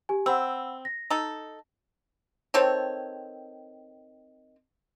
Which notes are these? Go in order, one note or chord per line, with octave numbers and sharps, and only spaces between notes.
G4 G#5
C4 F#5 B5 E6
A#6
D#4 A4
D#3 C4 A4 C#5